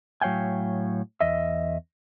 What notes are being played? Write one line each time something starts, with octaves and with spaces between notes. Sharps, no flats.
A2 F#3 C#5 F5 G5 G#5
E2 D#5 E5